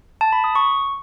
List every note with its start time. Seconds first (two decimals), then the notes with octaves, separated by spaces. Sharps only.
0.21 A5
0.32 B5
0.44 D#6
0.55 C#6